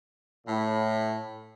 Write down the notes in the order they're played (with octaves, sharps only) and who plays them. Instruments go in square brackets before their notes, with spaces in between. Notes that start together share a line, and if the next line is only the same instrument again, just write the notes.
[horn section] A2